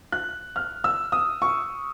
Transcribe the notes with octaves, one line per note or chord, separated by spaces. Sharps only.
F#6
F6
E6
D#6
C#6